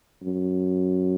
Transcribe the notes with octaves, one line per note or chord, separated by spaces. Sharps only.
F#2